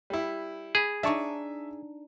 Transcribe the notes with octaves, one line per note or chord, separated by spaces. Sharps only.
G3 E4
G#4 B5
D4 D#4 E5 A5 C#6